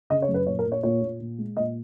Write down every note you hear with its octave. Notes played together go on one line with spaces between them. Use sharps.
C#3 D#5
C#5
F#2
B4
A#2 C#5
A#4
A#2
C#5
A#2 C#5
A#2
A#2
G#3
A#2 D#5